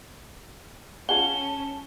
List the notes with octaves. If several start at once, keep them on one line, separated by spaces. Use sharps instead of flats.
C#4 F4 G#4 F#5 A5 G7